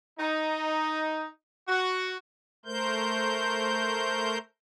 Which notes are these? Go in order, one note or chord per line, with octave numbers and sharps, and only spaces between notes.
D#4
F#4
A3 A#4 C5 G6